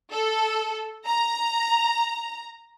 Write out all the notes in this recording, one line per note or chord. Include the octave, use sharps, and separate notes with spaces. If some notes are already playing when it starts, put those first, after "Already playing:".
A4
A#5